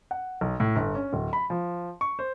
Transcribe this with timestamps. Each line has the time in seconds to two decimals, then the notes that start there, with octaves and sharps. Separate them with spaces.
0.11 F#5
0.41 B1
0.60 A2
0.76 G1
0.95 C#4
1.13 D1
1.33 B5
1.50 F3
2.01 C#6
2.19 C5